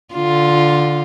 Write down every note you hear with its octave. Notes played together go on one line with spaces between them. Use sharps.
D3 F4